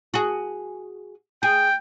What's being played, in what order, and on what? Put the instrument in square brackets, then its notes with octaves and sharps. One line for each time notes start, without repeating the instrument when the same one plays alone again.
[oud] F#4 G#4
[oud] G#4 [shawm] G5